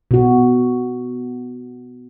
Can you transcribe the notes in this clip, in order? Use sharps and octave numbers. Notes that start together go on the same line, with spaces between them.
B2 F#4